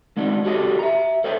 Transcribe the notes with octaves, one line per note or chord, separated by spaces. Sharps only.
G#3 C4 D4 D#4
F#4 G4 A4 C#5 D#5
E5 A#5
A4 C5 C#5 D#5 E5 G5